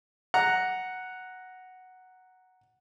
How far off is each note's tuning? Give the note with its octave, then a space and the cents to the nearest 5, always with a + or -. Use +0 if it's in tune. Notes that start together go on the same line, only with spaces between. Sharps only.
F#5 +0 A#5 +0